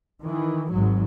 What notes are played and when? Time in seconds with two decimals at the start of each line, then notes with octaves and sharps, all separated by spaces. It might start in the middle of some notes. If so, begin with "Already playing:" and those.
0.22 D#3 E3
0.72 G#1 G#2 F#3